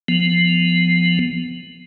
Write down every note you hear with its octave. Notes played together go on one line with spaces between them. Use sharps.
F3 B3